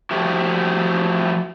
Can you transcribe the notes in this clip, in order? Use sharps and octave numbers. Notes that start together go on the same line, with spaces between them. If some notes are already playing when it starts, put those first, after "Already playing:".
F3 A3 E4 F#4 G4